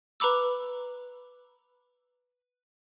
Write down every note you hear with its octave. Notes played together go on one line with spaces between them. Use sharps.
B4 A#5 B5 D6 E6